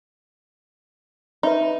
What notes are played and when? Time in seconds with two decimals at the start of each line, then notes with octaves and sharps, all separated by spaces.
1.43 D#4 B4 E5 B5